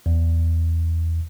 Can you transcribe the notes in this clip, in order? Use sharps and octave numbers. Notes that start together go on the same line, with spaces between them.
E2